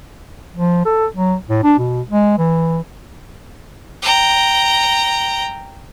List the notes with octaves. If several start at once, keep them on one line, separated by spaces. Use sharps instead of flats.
F3
A4
F#3
A2
D4
B2
G#3
E3
G5 A#5